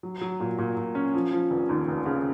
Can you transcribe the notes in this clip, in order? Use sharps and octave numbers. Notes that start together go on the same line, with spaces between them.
F#3
F#3
A#2
A#2
A#2
C#4
F3
F3
F1
D#2
F1
C#3